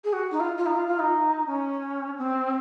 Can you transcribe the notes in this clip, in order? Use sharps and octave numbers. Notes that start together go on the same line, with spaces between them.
G#4
F#4
D#4
F4
F4
D#4
F4
F4
D#4
C#4
C4